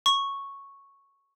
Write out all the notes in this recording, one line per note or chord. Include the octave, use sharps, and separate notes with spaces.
C#6